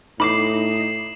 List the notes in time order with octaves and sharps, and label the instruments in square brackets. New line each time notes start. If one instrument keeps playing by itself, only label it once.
[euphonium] A2 [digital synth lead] D#4 [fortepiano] B5 D6 [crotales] C7 E7 F#7